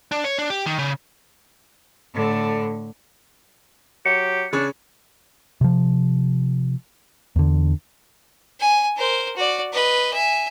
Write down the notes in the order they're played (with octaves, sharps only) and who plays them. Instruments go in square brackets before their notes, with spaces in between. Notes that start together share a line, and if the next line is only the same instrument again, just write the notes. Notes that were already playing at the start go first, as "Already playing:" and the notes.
[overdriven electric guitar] D4
C#5
D4
G4
D#3
C#3
[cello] A2 D3
[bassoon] F#3 [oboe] G4 [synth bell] C#7
[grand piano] C#3 C#4 C#5 [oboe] D4
[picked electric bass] C3 F3
E2 D3
[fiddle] G#5
A#4 C5
F#4 D5
B4 D#5
E5 G#5